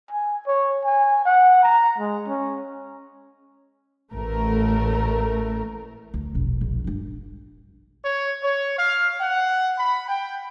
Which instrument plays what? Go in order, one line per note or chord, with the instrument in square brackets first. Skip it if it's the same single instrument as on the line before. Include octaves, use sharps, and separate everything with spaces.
[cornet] G#5
C#5
G#5
F#5
A#5
G#3
C#4
[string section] A1 A3 A#4
[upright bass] D2
E1 A#1
A#1
G2 D4
[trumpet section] C#5
C#5
F5
F#5
B5
G5